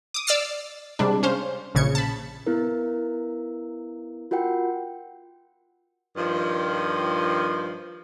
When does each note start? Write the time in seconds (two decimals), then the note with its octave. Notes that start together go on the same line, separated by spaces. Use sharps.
0.14 D6 D#6
0.27 D5 D6 E6 F6 A6 C7
0.99 C3 G3 G#3 D4
1.23 C#4 C5 F5
1.75 A#1 C#3 G#6 C#7
1.95 A5 B5
2.46 B3 E4 A#4
4.31 F4 F#4 A#4 F#5 G5
6.16 G2 D#3 F3